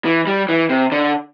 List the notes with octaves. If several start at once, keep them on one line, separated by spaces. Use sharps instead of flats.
E3
G3
E3
C3
D3